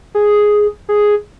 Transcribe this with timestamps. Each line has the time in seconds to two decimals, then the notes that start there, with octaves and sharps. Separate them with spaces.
0.15 G#4
0.89 G#4